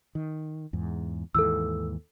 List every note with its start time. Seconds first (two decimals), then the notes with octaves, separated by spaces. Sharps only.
0.15 D#3
0.73 E2 G#2
1.35 D#2 G#2 E3 A4 E6